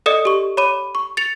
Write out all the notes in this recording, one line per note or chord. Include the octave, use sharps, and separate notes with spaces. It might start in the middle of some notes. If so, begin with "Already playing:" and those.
A4 D5 D#5 D#6 C#7
G4 C#6
C#5 B5 D6 D#7
C#6
A6 C#7 F7